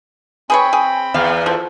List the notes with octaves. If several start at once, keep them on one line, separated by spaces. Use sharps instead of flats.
C4 G#4 B4 C#5 G5 B5
G#4
E2 F5
F3 A4